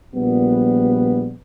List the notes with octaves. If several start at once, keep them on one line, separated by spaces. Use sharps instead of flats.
A#1 A#2 G3 B3